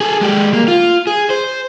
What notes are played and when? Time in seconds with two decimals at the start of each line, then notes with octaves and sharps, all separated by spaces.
0.01 G#4 A4
0.21 G#3 G4
0.53 A#3
0.68 F4
1.07 G#4
1.30 C5